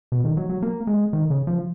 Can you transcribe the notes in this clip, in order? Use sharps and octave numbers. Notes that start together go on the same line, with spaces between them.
B2
D#3
F#3
F#3
A#3
G#3
D#3
C#3
F3